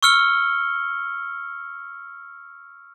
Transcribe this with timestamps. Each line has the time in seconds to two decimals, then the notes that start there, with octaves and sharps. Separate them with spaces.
0.03 C#6 E6 F6 C#7 G7